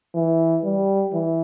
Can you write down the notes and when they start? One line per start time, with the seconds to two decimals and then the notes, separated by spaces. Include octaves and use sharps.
0.15 E3
0.64 G3
1.14 E3